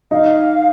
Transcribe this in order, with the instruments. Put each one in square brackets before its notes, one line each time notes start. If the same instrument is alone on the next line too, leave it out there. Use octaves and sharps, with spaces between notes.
[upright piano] D#4 [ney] F5